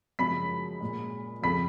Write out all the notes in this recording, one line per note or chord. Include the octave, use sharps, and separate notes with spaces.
F#2 C#3 F3 G#3 B5 B6
A#2 G#3
F2 C#3 F3 B5 B6